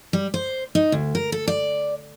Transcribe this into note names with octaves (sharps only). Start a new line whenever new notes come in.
G3
C5
D#4
D2
A#4
A4
D5